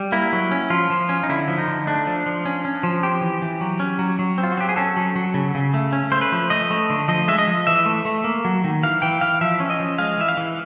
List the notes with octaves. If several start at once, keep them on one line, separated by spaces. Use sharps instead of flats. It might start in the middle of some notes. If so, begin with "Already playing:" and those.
Already playing: G3
A#3 E4
F#3
C#4
F3 F4
F3
C#4
D#4
D3 E4
F3
D#4
D3
A3 D4
F3
F3
C#4
C#4
F3
C4 G4
E3
E3
F#3
C#4
F#3
F#3
C4
F4
F#4
F#3 G4
G#4
C#4 A4
F#3
F#3
C#3
C#3
A3
C#4
A3 C5
B4
F3
A3 D#5
A3
D3
F3 D#5
G#3 E5
D#5
F3
E3 E5
A3
A3
A#3
F#3
D#3
E3 F5
E3 G5
E3 F5
F3 E5
C#4
D#5
F3
G#3 F5
E3 E5
F5
E3